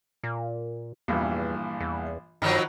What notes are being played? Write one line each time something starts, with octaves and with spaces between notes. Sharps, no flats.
A#2
A#1 E2 G2 E3
E2
G2 D#3 F3 F#3 A#5 B5 F6